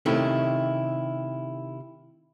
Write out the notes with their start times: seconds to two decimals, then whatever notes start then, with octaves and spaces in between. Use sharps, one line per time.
0.06 C3 D#3 A3 C#4 E4